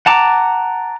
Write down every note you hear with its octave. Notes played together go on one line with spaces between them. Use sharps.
F#5 A5 A#5 D6